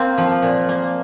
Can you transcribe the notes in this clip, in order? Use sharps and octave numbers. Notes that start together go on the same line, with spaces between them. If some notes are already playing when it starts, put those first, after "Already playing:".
Already playing: A#3 C4
F3
A#2
A#3